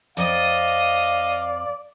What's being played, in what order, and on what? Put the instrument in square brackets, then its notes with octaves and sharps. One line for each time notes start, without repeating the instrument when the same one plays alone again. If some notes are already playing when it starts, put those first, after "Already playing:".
[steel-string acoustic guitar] F2 [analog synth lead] D5 [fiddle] D#5 [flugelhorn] F5